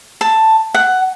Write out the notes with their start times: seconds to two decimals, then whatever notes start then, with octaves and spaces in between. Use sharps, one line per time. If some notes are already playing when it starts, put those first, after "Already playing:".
0.21 A5
0.74 F#5